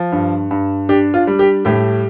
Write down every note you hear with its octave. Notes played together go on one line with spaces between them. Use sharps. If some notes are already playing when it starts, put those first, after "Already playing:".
Already playing: F3
G2
G2
D4 G4
F4
G3
G4
A2 G4